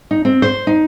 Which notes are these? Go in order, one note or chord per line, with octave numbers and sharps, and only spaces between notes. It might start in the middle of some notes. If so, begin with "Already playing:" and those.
D#4
C4
C5
D#4